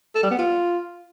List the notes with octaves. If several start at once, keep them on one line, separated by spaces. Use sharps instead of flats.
A4
G3
B3
F4